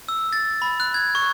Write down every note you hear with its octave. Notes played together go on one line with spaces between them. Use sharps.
E6
A6
B5
F#6
G#6
C#6